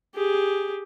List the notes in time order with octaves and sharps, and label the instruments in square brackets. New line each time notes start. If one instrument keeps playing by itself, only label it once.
[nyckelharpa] G4 G#4